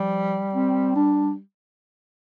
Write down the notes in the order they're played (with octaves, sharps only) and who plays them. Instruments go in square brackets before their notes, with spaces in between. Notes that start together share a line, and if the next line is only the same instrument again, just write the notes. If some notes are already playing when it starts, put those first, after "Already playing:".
Already playing: [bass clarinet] F3 [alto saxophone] G3
[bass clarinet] C4
D4